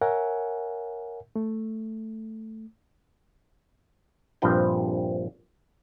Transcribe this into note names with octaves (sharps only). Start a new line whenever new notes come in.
A#4 C#5 E5 F#5 G#5
A3
A#1 G2 F3 C4 B4 G5